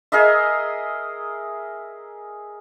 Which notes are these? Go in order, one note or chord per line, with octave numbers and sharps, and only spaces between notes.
G#4 A#4 D#5 E5